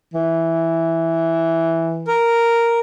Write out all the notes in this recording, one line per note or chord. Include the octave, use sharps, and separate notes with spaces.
E3
A#4